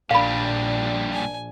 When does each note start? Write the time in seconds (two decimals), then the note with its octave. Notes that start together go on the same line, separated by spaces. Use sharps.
0.11 A#1 A#2 G3 D4 F5 B5
1.13 G#5